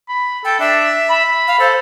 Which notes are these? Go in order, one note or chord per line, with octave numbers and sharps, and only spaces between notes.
B5
A4 G5
D4 E5
B5
F5
A4 C5